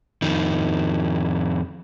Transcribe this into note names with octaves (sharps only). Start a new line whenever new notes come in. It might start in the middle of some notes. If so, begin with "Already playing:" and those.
F2 D#3